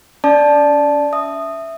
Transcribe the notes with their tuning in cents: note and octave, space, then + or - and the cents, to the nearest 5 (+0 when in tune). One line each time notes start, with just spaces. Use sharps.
C#4 +35 D5 +0 A5 -10
E5 +0 D#6 -10